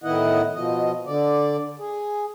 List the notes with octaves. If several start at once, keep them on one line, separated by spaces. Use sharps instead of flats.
A2 D#3 B3 E4 D#5 F#5
B2 F3 D#5
D3 D5
G#4